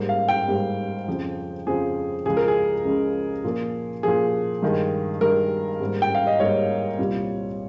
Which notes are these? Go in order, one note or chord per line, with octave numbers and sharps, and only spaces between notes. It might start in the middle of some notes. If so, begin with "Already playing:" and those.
Already playing: G#2 G3 A#3
F5
G5
G#2 G3 A#3
F2 C#3 F3
F2 C#3 F3 G#4
C#2 C#3 F3 G#3 G#4
A#4
G#4
C#2 C#3 F3 G#3
A#2 F3 A#3
A#2 F3 A#3 G#4
G2 D#3 G#3
G2 D#3 G#3 A#4
G#2 G3 A#3
G5
F5
D#5
G#2 G3 A#3 C#5
C2 A#2 G3